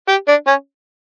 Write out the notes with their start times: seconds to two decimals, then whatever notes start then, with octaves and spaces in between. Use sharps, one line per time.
0.08 G4
0.28 D4
0.47 C#4